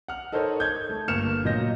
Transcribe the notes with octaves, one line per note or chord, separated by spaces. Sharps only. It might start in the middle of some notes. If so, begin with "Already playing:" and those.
F#5 F6
D#4 A4 A#4 C5 C#5 D#5
G6 G#6
A3
G1 A#3 F6 C#7 E7
A#2 F#3 D#5 G6 A#6